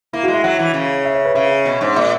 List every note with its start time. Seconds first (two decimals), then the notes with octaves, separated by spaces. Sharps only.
0.13 A#3 E4
0.23 F#4
0.28 G#3
0.34 E5
0.44 F#3 F#5
0.59 E3
0.74 C#3
1.05 E5
1.14 C#5
1.25 B4
1.35 C#3 E5
1.65 B2
1.81 G#2
1.96 A#2 E5